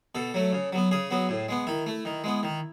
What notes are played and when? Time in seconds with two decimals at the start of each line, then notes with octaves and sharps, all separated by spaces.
0.15 B2 A4
0.34 F#3 A3
0.53 C#3
0.73 F#3 B3
0.91 C#3 G#4
1.10 F#3 B3
1.29 A2
1.49 G#3 B3
1.67 D#3 E4
1.86 A3
2.05 D#3
2.24 G#3 B3
2.43 D#3